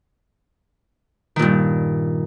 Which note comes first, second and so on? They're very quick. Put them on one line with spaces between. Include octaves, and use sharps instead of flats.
D#3 A#2 G2